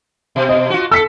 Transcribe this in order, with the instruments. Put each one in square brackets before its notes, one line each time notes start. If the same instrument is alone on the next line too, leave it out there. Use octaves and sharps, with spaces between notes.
[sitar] B2
[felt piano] D#5
[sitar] F4 F#4
[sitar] A4 [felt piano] E6 B6 C#7